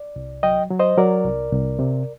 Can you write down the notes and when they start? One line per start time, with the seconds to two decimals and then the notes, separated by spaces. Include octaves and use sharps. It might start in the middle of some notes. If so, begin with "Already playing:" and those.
Already playing: D5
0.16 C2
0.43 F#3 D#5 G5
0.71 F#3
0.79 C5 D#5
0.97 F#3 A#4 D5
1.25 C2
1.52 C2
1.79 C3